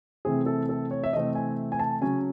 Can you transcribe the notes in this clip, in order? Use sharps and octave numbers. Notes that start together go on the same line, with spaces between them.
C3 E3 A3 C4 G#4
A4
A4
C#5
E5
C3 E3 A3 C4 D#5
G#5
G#5
A5
C#3 F#3 C#4 G#5